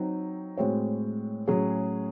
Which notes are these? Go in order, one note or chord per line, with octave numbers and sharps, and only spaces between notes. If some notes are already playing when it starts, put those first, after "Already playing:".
Already playing: F#3 C4 D#4
A2 G#3 C4 F#4 C#5
A2 F#3 C#4 G#4